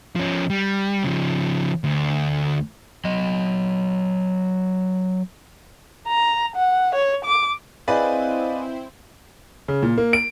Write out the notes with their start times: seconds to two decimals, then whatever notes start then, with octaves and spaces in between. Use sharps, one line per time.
0.16 F3 C#4
0.50 G3
1.04 C#3 F3
1.84 D2
3.05 F#3 D#5
6.07 A#5
6.56 F#5
6.95 C#5
7.25 D6
7.88 C4 E4 G#4 B4 C5 D5 D#5 F5
9.68 C#3
9.83 A#2
9.98 A#3
10.13 D7